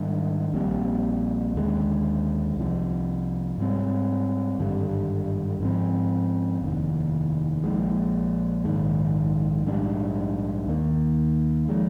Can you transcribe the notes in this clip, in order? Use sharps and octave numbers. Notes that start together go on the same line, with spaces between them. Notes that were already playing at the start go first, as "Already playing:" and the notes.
Already playing: G#2 D#3 G3 D4
A#1 A#2 G3 C4
D#2 D3 G#3
C2 C3 F3
G#2 G3 C4
G#1 G2 D3 G3
G#2 F3 C4
F1 D#2 D#3
A#1 A#2 F3 G#3
A#1 G#2 D#3 G#3
A#1 G#2 G3 D4
D#2 D#3 A#3
F3 G#3